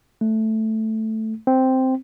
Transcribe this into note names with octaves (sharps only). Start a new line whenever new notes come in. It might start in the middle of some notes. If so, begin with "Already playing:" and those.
A3
C4